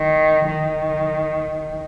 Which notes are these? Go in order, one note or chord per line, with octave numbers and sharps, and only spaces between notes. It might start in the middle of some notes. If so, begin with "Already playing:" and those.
Already playing: D#3
D#3